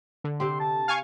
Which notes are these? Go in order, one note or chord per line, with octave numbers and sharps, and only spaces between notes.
D3
C3 C4 G4 C6
A5
F5 G#5 C#6